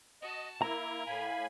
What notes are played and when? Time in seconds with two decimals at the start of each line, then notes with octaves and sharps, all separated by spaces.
0.22 F#4 D#5 A5
0.62 A#3 E4 A#4 A#5
1.07 A2 F5 G#5 B5